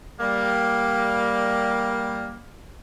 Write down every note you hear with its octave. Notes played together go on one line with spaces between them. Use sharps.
G3 A#3